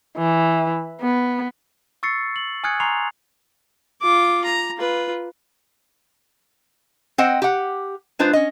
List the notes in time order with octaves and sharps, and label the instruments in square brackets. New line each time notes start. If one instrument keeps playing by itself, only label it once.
[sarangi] E3
B3
[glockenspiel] C#6 E6 A6 C7 C#7
F#7
G#5 D#6 F6 F#6 G#6 C#7
G#5 A#5 C6 C#6 C7 F7
[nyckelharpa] F4 D6
A#5
F4 B4
[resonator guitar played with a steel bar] C4 C5 D#5 F#5 G5
G4 F#5
G#3 D4 F4 B4 C5
C#4 D#5